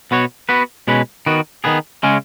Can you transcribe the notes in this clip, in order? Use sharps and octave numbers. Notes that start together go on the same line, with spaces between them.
B2 B3 F#4 C#5
B3 F#4 B4
B2 G#3 C#4 B4
D#3 B3 F#4
D#3 B3 G#4
C#3 G#3 C#4